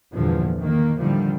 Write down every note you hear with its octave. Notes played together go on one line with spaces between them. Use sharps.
E2 G2 A#2 D3 F3
D#3 A#3
A2 D3 D#3 F3 G3